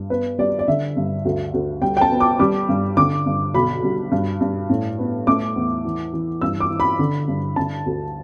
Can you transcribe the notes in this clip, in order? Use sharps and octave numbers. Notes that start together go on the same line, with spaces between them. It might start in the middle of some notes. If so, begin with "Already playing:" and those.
Already playing: G2
B3 B4
G3 D5
D5
D3 E5
G2
D2
D2
G3 G5
G5
A5
B3
D6
G3 D6
G2
D3 D6
G2
B1 B5
G3
G2
G2
A2
B3
A3 D6
E2
E3
E3
G2 E6
D6
E3
B5
D3
G2
D3 A5
D2